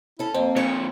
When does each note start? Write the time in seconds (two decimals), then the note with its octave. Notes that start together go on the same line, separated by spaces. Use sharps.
0.19 C#4 E4 A4
0.34 F2 A#3 C4
0.56 F2 A#2 C#5